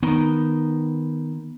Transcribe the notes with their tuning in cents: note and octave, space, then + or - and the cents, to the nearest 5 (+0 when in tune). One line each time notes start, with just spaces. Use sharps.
D#3 +0 B3 +0